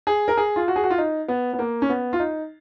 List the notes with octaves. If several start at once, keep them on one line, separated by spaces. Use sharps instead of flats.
G#4
A#4
G#4
F4
F#4
G#4
F#4
F4
D#4
B3
B3
A#3
C#4
B3
F4
D#4